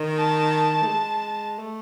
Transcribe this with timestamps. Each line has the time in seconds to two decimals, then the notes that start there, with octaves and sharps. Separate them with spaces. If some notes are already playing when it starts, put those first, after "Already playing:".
Already playing: D#3
0.17 A5
0.83 A3
0.88 G#3
1.59 A3